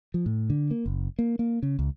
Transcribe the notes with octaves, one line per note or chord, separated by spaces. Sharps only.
F3
A2
D3
A#3
F#1
A#3
A#3
C#3
C#2